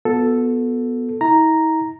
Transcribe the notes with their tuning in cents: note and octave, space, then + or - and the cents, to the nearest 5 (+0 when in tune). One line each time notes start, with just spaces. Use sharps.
B3 +0 F#4 -45 A4 +0
E4 -45 A#5 +0